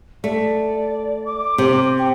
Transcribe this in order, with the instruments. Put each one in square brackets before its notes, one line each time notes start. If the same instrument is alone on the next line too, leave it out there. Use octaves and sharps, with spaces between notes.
[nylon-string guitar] A3 [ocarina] D5
[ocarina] D6
[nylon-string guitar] C3
[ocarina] G5